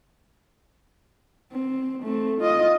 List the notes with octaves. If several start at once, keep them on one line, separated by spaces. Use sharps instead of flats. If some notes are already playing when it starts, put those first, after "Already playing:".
C4
A3 C4
F4 D#5